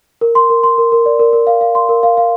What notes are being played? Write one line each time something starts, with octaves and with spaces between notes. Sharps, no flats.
A#4
C6
A#4
C6
A#4
A#4
D5
A#4
A#4
F5
F5
C6
A#4
F5
F5